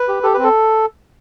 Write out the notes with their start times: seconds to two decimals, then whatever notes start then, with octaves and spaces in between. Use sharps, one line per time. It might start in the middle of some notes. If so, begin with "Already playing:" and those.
Already playing: B4
0.08 G4
0.23 G4 A4
0.34 C4 B4
0.43 A4